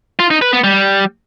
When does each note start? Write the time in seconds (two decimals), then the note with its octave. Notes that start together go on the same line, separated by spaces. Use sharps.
0.19 F4
0.30 D#4
0.42 B4
0.53 B3
0.64 G3